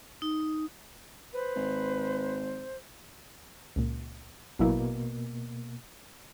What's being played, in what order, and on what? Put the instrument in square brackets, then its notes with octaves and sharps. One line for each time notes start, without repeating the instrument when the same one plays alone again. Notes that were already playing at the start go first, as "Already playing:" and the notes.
[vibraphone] D#4
[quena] B4 [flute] C5
[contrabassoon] G#1
[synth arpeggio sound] C#2 A#2
[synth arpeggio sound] A1 F#3 E4 [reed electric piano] B2 A#3